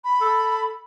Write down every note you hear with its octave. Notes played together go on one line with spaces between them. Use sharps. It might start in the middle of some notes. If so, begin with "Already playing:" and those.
B5
A4